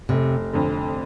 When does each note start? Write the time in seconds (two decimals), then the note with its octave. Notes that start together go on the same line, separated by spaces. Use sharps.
0.09 F1 C3
0.53 F2 D3